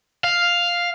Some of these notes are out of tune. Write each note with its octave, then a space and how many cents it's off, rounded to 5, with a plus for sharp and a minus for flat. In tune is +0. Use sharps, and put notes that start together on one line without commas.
F5 +0